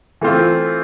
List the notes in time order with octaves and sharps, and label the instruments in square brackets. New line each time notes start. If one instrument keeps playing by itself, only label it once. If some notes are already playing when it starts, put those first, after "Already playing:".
[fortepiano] E3 A3 C4 F4